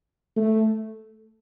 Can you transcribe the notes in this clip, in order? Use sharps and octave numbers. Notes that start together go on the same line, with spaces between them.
A3